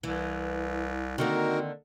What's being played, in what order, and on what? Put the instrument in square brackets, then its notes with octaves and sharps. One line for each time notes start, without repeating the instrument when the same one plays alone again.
[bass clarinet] C2 [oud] E3
[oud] D3 D#3 A#3 [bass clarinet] C4 [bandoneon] D#4 F#4 A#4